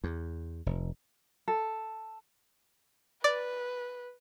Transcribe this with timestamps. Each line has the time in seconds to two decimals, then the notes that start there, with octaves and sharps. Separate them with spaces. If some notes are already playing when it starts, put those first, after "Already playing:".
0.04 E2
0.66 F1
1.48 A4
3.24 B4 D5